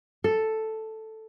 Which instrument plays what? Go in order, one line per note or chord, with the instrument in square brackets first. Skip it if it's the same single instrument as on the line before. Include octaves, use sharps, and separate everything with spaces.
[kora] A4